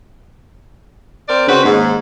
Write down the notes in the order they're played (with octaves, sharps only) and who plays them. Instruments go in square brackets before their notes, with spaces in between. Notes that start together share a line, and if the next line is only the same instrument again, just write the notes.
[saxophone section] C4 A#4 D5
[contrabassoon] C#3 [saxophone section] C4 F#4 B4
[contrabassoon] D#2 [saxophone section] G#2